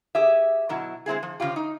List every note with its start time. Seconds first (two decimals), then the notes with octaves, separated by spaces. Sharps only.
0.15 G4 G#4 E5
0.69 B2 F#3 E4
1.06 G#3 C4 E4 G#4
1.23 F3
1.40 C#3 F3 F4 G4
1.56 D#4